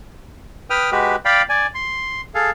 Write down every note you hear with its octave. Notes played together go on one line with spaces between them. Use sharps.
B4 G5 D#6 F6
G#3 F#4 G4 B4
D5 F5 G5 B5
D5 G#5
C6
G#4 A4 F5